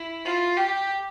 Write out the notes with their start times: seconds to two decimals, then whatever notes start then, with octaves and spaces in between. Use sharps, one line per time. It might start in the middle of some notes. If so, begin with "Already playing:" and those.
Already playing: E4
0.25 F4
0.57 G4